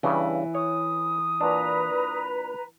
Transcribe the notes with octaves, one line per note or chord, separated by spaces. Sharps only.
G2 C#3 E3
C#5 D#6
A#2 D4 B4 A#5